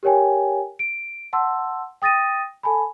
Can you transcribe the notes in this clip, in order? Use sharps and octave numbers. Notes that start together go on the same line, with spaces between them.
G4 A#4 C#5 G5 G#5
D7
F#5 A5 C6 E6
G5 D#6 A6 A#6 D#7
A4 G#5 A5 B5